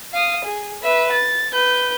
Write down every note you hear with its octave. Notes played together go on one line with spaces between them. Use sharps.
F5 D#6
G#4
B4 E5
A6
B4 G6